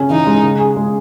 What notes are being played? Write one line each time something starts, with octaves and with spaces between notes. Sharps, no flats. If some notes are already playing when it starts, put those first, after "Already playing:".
Already playing: C#3 C#4
E3 D#4
G#3
C#3
G#4
G#3